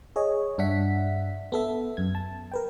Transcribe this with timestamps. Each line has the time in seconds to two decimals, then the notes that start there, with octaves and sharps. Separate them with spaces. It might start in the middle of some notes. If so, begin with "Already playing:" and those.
0.16 G#4 C#5 D#5
0.58 G2 D4 E5 F#5 B6
1.52 B3 A4 E5
1.97 F#2 G#6
2.15 A5
2.52 A#4 B4 G5